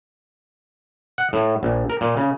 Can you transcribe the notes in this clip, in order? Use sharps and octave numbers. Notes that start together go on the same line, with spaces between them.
F#5
A2
A#1
A#4
A#2
C#3